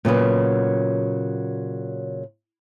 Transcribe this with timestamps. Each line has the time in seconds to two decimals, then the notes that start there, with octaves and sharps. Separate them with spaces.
0.05 A#2 C#3 F#3 B3